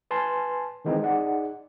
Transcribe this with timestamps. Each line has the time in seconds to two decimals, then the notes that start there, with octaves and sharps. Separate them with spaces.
0.11 B4 G#5 A5 C6
0.85 D#3 E3 G#3 C4 D#4
1.02 D#4 G#4 D5 F#5